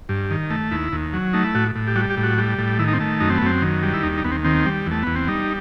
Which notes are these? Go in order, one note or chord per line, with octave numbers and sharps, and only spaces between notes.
G2
D#3
A3
D#2 E4
D#2
F#3
A3 D#4
E4
A2 F#4
A2
G4
G3 F#4
G4
A2
F#4
G3
A2
D#3 E4
D#4
C4
A3
F#2 D#4
C4
B3
F#2 C4
D#3
G3
E4
D#2 D#4
D#4
D#2 B3
C4
D#3 C4
G3
E2
A3
E2 B3
C4
G3 D#4